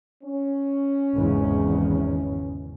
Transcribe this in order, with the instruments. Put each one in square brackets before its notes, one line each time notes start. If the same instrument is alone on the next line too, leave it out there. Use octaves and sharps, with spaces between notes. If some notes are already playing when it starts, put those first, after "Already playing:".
[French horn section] C#4
[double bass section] G#1 E2 C#3